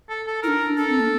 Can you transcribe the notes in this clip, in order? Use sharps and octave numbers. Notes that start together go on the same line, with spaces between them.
A4
A4
D4 E4 A#4
D4 A4
C4
A#3